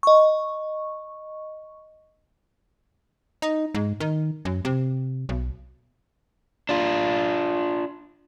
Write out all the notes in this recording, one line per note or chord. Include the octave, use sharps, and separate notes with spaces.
D#5 C#6
D#4
G#2
D#3
F#2
C3
B1
D4 F4